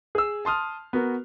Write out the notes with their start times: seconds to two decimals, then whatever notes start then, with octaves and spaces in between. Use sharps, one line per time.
0.15 G#4 E6
0.45 A5 C6 D#6 F6
0.93 B3 F#4 A#4